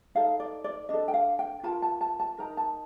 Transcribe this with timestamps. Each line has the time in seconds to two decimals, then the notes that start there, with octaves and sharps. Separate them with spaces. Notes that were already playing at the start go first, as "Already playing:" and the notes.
0.15 D#4 A4 F5
0.40 D5
0.64 D5
0.89 D4 A4 D#5
1.08 G5
1.14 F5
1.39 G5
1.63 F4 A#4 A5
1.82 A5
2.01 A5
2.20 A5
2.38 D#4 A#4 A#5
2.57 A5